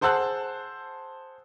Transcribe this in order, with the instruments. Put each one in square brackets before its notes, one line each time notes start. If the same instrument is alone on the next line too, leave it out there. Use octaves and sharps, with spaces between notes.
[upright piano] G#4 C5 F#5 A5 E6 F#6